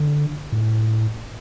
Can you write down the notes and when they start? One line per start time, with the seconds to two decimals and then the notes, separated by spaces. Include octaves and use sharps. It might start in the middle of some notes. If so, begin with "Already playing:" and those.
Already playing: D3
0.52 A2